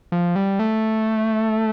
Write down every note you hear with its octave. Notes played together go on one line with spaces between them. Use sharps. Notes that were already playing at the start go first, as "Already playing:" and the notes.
F3
G3
A3